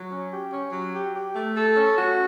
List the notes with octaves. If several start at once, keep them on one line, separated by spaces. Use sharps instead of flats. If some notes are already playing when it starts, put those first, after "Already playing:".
Already playing: F#3
C#4
G4
C#4
F#3
G4
G4
A3
A4
C#4
F#4